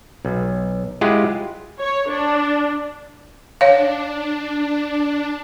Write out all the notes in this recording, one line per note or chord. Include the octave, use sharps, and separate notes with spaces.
B1
G#3 E4 F4 G4 G#4 F#5
C#5
D4
D4 C#5 F5